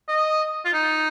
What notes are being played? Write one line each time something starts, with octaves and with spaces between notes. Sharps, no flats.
D#5
F4
D#4